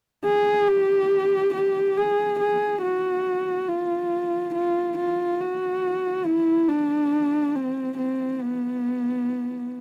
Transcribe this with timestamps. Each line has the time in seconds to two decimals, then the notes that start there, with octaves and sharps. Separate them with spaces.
0.25 G#4
0.68 G4
1.54 G4
1.97 G#4
2.39 G#4
2.82 F#4
3.69 F4
4.54 F4
4.98 F4
5.40 F#4
6.25 E4
6.69 D4
7.55 C4
7.97 C4
8.41 B3